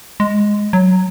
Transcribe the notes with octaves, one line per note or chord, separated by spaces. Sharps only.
G#3
F#3